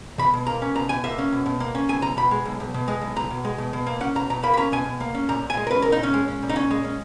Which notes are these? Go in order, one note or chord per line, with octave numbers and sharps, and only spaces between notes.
B2 B5
B2
A#3 A#5
C#4
B2 A#5
B2 G#5
A#3 E5
C#4
B2
B2
A#3
C#4
B1 G#5
B1 A#5
B2 B5
G#3
B1
B1
B2
G#3
B1
B1 A#5
B2
G#3
B2
B2
A#3
C#4 F#5
B2 A#5
B2 A#5
A#3 B5
B5
C#4 A#5
B2 G#5
B2
A#3
C#4
A#2 A#5
A#2
G#5
G#3
A#4
C#4 B4
A#4
A#2
D#4
A#2 C#4
G#3
C#4
A#2
D#4
A#2 C#4
G#3
C#4